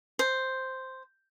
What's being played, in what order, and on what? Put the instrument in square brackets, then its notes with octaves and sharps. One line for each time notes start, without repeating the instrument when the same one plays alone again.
[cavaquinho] C5